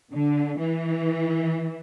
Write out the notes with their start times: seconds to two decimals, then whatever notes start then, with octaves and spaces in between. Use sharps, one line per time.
0.14 D3
0.59 E3